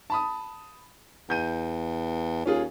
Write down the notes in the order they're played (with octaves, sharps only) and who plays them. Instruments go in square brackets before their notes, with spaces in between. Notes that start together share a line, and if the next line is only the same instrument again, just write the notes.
[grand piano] A5 B5 D#6
[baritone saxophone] E2 [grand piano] G6 D#7
[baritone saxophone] D#2 [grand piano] C#4 F4 G#4